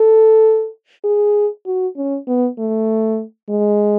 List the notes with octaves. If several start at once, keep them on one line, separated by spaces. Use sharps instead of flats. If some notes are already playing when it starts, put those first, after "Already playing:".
Already playing: A4
G#4
F#4
C#4
B3
A3
G#3